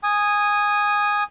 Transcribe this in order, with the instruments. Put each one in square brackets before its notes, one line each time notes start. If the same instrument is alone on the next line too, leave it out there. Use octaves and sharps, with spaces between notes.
[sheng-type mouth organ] G#5 D#6